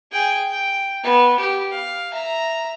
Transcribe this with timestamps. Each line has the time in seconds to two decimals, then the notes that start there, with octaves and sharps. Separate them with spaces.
0.12 G#4 G5
0.51 G5
1.04 B3
1.39 G4
1.71 F5
2.12 E5 A#5